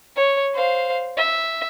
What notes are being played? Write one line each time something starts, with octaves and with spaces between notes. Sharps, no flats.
C#5
C5 F5
E5